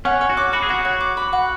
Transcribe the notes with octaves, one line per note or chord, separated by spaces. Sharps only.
C#4 F#5
C#5
F#4
D6
F#4 B5
G#4
F#4 F#5
C#5
D6
B5
F#5